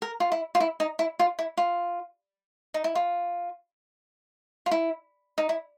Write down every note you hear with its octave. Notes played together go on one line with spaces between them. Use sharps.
A#4
F4
E4
F4
E4
D#4
E4
F4
E4
F4
D#4
E4
F4
F4
E4
D#4
E4